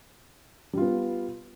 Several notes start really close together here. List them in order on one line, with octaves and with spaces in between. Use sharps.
G3 F4 B3